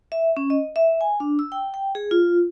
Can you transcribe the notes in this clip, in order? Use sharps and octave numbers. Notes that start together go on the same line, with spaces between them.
E5
C#4
D#5
E5
G#5
D4
E6
G5
G5
G#4
F4